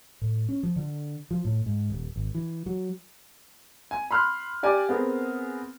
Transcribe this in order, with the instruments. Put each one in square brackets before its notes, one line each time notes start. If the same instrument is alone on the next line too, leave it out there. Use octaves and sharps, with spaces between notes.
[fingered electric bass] A2
C#4
F3
D3
F3
A2
G#2
D#1
G#1
E3
F#3
[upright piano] G#5
B5 C6 F6 F#6
G4 D5 G#5 D6
B3 C4 G#4 A#4